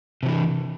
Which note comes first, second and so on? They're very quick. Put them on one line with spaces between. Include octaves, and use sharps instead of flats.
C3 F3 E3